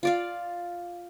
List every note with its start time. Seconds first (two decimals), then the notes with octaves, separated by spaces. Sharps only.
0.03 F4 D5 F5